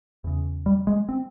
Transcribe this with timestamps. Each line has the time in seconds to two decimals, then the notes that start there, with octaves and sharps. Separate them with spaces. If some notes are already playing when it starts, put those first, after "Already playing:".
0.24 E2 C#3
0.66 G3
0.87 G#3
1.09 C4